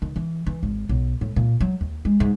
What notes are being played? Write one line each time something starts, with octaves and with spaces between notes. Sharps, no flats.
D#3
E3
E3
G#1
B1
A2
A#2
F#3
D#2
G#3
G#2